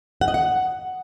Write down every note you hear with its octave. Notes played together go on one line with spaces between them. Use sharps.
F#5
D#5
F#5